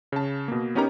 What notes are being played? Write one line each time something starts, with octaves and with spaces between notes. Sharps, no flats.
C#3 A5
B2 A#3
B3 C#4 D#4 G4 A#4 A#5